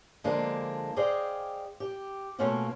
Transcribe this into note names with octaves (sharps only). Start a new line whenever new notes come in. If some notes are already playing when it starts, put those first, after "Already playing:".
D3 F3 G#3 A#3 D4
G#4 C5 D5 D#5 F5 G5
G4
B2 A3 A#3 C#4 F4 F#4